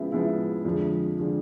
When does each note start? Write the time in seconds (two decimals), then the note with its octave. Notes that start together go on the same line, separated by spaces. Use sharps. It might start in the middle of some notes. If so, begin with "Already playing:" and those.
Already playing: C#3 F3 G#3 B3 E4
0.12 C#3 F3 G#3 B3 E4
0.65 F2 D3 F3 G#3
1.19 D3 F3 G#3